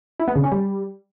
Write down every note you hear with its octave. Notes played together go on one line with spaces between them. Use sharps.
E4
B3
C#3
C#4
G3